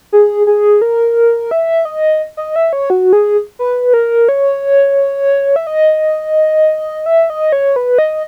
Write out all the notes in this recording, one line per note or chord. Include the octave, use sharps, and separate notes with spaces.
G#4
G#4
A#4
E5
D#5
D#5
E5
C#5
F#4
G#4
B4
A#4
C#5
E5
D#5
E5
D#5
C#5
B4
D#5